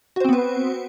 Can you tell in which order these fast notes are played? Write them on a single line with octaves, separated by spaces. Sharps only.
F#4 C5 C4 B3 B4